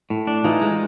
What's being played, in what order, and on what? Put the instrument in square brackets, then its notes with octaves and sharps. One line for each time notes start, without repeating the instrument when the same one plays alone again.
[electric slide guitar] A2
D4
[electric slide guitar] E3 [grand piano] D#4 F4
[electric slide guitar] G#3